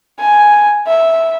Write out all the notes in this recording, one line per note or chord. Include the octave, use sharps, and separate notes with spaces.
G#5
E5